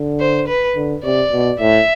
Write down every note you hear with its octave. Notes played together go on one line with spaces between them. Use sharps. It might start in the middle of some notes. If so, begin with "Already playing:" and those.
Already playing: D3
C5
B4
D3
C3 D5
B2
A2 E5